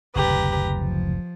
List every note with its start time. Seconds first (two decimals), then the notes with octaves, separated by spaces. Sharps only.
0.15 F#1 D2 C3 G4 B4 A#5
0.76 F3